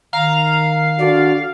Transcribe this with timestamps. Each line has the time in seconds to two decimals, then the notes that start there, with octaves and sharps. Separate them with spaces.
0.13 D#3 F5 A#5
0.99 D3 D4 F#4 D5